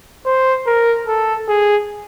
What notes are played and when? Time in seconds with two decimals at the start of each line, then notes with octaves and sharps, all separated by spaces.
0.26 C5
0.67 A#4
1.07 A4
1.48 G#4